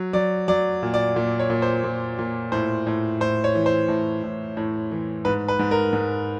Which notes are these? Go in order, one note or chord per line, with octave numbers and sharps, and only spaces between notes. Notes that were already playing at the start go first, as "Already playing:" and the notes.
Already playing: F#3
F#3 D5
F#3 D5
A#2
D5
A#2
C#5
A#2
C5
A#2
A#2
A2 C5
A2
A2 C5
C#5
E3
C5
A2
A2
A2
E3
G#2 B4
B4
G#2
A#4
G#2